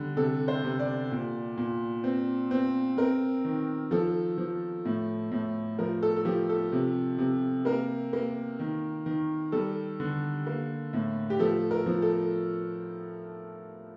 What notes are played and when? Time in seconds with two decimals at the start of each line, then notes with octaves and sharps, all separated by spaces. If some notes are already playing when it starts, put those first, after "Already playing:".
Already playing: D3 G3
0.16 C3 A4
0.48 C5
0.64 C3
0.79 D5
1.11 A#2
1.57 A#2
2.04 C4
2.51 C4
2.98 C4 A#4
3.44 D#3
3.91 F3 A4
4.38 F3
4.85 A2
5.31 A2
5.79 F3 A#4
6.03 A4
6.16 A4
6.25 F3 G4
6.49 A4
6.72 C3
7.18 C3
7.65 A#3 A#4
8.13 A#3
8.59 D#3
9.06 D#3
9.52 G3 A4
10.00 D3
10.47 A#3
10.93 A2
11.30 G4
11.39 F3 A4
11.71 A#4
11.86 F3
12.02 A4